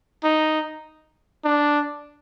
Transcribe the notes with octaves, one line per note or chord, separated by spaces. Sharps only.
D#4
D4